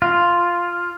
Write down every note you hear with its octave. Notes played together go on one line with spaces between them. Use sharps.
F4